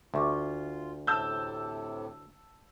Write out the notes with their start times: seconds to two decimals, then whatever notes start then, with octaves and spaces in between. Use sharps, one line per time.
0.14 D2 F4 E5 C#6 D6
1.07 A2 C3 A5 E6 G6